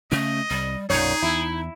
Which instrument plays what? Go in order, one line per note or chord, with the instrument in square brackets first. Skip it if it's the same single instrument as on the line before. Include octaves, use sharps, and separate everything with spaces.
[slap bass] C#3 C#4 [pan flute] A3 [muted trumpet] D#5
[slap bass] C2 [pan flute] G3
[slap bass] B1 F#2 [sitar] A#2 C#5 [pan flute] D#4 [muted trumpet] G#4
[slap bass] E2 [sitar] E4